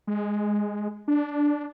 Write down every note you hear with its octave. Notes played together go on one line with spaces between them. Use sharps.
G#3
D4